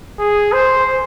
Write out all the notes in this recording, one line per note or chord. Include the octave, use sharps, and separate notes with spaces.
G#4
C5